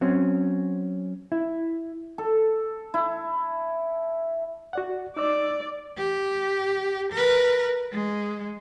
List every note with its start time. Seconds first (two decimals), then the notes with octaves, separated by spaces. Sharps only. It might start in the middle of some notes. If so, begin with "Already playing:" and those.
0.01 F#3 C4 C#4
1.32 E4
2.18 A4
2.94 E4
4.73 F#4 D5 F#5
5.17 D#4 D5 D6 E6
5.98 G4
7.12 A#4 B4
7.93 G#3